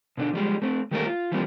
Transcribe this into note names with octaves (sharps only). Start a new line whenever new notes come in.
B2 D3 D4
F3 G3 G#3
A3 C4
D#3 G3 A3 A#3 A4 A#4
F4
E3 F3 G3 A#3 C4